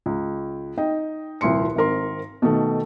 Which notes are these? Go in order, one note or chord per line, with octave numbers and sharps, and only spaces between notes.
C#2
D#4 D#5 G5
D#1 C2 F3 C6 C#7
G#1 C4 A#4 C6
B2 D#3 A3